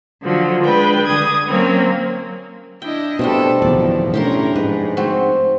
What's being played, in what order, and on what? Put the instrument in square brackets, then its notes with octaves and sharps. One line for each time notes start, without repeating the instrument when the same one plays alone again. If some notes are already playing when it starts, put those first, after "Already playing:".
[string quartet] D3 F3 F#3
G#3 D4 B4 G5
D3 D#6 G#6
F#3 A#3 C4 C#4
[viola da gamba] D4 E4 D#5 [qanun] G5
[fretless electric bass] B2 [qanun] G3 A3 C4 [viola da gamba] D4 A4
[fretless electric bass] D1 E2 [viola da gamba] B2 D#3 F3 [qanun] D5
[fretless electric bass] A2 [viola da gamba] C#4 D4 A#4 [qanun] G4 G5 C6
[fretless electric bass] G#2 [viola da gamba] F3 [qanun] B4
[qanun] A3 C4 F#4